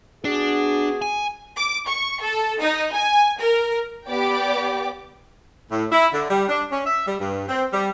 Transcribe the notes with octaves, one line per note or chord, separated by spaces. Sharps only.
B3 D4 F#4 G#4 D5
G#5
D6
C#6
A4
D#4
G#5
A#4
B3 G4 D5 G5 D6
A2
E4
D3
G3
D4
C#4
E5
G3
G2
C4
G3